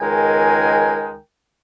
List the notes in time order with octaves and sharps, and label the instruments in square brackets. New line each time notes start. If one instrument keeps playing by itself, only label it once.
[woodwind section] C#2 D#3 G#3 A#4 G5 G#5